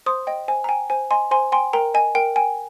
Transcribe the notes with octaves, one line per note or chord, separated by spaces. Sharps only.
C5 C6 D#6
D#5 G5
C5 G#5
A#5
G5 G#5
C5 G#5
D#5 G#5 C6
C5 G#5 C6
G5 G#5 C6
A#4 G5 A#5
D#5 G#5
A#4 G5
G5 G#5